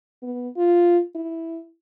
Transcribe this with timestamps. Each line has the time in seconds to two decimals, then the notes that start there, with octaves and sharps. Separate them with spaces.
0.23 B3
0.57 F4
1.15 E4